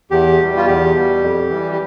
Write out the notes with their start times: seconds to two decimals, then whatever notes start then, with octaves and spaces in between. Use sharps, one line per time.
0.11 E2 G4
0.39 B2 G3
0.57 F4
0.67 E2 G4
0.94 B2 G3
1.22 F2
1.50 E3 G3
1.71 G4